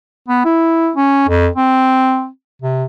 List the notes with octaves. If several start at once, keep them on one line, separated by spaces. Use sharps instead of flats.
B3
E4
C#4
F2
C4
C3